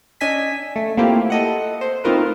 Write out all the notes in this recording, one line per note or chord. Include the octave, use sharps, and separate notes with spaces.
C#4 D4 D#5 G#5 E6 B6
A3
A3 A#3 C4 E4 F4 G4
A4 D#5 F#5
C5
A3 C4 D#4 F4 A#4 B4